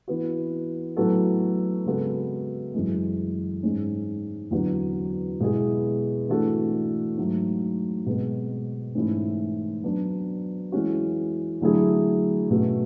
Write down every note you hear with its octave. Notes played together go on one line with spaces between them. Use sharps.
E3 B3 F#4
A2 F#3 B3 F#4 A4
C#3 G#3 B3 F#4 A4
F#2 E3 G#3
G#2 G#3 C#4
E2 D3 F#3 B3 F#4
B2 G#3 B3 E4 G#4
E3 A3 D4 F#4 A4
G#2 F#3 A3
B2 G#3 B3
G#2 E3 A3 C#4 E4
F#3 B3 D4
E3 G#3 C#4 F#4
D3 F#3 A3 E4 G#4
B2 A3 C#4 F#4